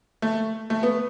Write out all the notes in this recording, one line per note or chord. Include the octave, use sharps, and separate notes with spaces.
A3
A3
B3